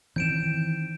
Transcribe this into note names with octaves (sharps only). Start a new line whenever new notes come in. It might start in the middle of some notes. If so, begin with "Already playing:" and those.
D#3 E3 C4 G6 D7 E7